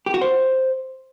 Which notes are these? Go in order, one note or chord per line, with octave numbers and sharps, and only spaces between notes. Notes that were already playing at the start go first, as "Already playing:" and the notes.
G4
F#4
C5